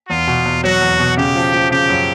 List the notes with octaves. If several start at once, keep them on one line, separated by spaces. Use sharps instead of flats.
E2 F4
B2
E2
F#3 F#4
E2
B2
C#3 G4
F3
F3
C#3 G4
F#2